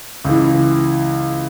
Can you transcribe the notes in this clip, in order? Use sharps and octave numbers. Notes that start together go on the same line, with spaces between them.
C#2 C#3 E3